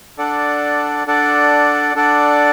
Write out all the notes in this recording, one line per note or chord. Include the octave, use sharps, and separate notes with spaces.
D4 A4 D5 F#5
D4 A4 D5 F#5
D4 A4 D5 F#5